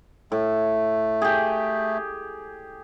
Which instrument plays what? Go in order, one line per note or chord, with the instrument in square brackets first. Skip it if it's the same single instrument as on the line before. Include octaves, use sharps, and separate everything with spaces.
[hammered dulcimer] A2 [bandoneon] A3
[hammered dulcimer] G4 G#4